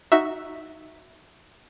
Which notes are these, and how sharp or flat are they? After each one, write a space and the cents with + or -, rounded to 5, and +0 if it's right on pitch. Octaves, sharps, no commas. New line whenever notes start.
D#4 +0 F#4 +0 E5 +0